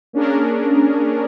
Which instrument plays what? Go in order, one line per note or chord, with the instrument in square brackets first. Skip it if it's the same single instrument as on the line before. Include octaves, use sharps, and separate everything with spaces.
[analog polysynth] A#3 C#4 D4 G#4 A#4